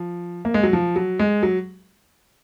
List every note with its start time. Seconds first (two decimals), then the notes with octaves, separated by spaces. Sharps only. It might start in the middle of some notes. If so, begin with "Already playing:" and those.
Already playing: F3
0.45 A#3
0.54 G#3
0.63 F#3
0.73 F3
0.96 F#3
1.19 G#3
1.43 F#3